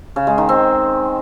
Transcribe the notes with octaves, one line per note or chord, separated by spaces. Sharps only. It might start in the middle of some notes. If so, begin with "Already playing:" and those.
C#3
G#3
D#3
C4